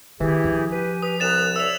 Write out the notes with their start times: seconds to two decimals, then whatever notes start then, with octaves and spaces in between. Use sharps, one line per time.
0.20 D#3 E3 E4 G4 G#4
0.44 F3 D4
0.72 G4 B4 G#5
1.03 B4 D#6
1.20 C2 A#4 D#6 F#6 A6 E7 F7
1.56 C#5 D5 E5 E6 F7